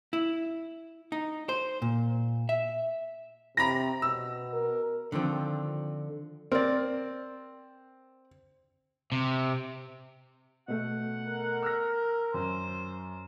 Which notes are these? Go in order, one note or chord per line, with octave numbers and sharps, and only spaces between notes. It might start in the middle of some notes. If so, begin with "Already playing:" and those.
E4
D#4
C5
A#2
E5
C3 A#5 B5 A#6
B2 E6
A#4
D3 D#3 F3 C4 F4
C4 A#4 D5
C3
B2 A3 F#5
A#4
E6 F6 A#6
F#2 C5